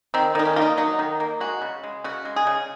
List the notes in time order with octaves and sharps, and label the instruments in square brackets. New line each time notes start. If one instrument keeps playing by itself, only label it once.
[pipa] D#3 C4
D#3 D#4
C#4
A#3 F4
D#4
F#3 D#4
D#3
A#3
G#3 F#4
C#3
G#3
C#3 F#4
G#3
G#4
C#3